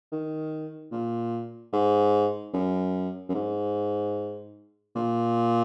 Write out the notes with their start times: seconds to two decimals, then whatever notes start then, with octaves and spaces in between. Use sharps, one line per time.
0.12 D#3
0.92 A#2
1.73 G#2
2.54 F#2
3.29 F#2
3.34 G#2
4.96 A#2